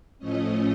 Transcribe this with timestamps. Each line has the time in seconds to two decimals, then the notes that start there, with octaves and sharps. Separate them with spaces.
0.18 A2 F3 A3 C#4 D#5